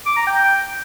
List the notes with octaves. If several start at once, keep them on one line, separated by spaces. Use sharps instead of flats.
D6
A#5
G5